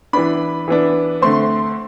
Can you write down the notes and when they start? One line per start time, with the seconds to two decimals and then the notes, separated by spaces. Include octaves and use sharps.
0.13 E3 B3 D4 B5
0.68 E3 B3 D4
1.22 D3 A3 C4 C6